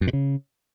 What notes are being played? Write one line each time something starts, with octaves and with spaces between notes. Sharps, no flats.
F#2
A#2
C#3